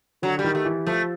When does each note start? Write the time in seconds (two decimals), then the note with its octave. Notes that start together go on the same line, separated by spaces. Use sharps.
0.22 D3 F#3
0.39 G3
0.44 D#3
0.55 A3
0.65 E3
0.87 F3 A3